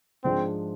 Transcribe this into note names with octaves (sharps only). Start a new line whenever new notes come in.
G#2 F3 G#3 C4 D4